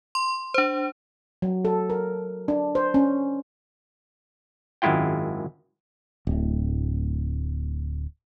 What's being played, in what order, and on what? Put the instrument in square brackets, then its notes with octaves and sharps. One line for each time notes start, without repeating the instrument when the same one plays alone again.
[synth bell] C6
D4 C5
[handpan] F#3
A4
A#4
D4
C5
C#4
[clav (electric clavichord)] G#1 F#2 G#3 E4 F4 G5
[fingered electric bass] D1 A2